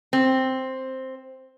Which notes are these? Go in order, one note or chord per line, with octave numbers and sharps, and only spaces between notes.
C4